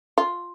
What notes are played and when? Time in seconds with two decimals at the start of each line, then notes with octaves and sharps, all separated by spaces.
0.18 F4